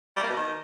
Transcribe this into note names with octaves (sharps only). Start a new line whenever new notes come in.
G3
A#3
B2
D#3